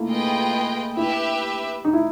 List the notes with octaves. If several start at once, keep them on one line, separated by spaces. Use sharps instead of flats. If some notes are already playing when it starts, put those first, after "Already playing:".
Already playing: A3 A#3 E4
F4 G#4 B4 D#5 G5
E4 G4 B4 E5
D#4
E4